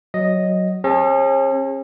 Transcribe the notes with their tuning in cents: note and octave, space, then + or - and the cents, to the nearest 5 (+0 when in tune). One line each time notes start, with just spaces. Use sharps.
F#3 +0 D#5 +0
C#4 -40 G#4 -30 A5 +0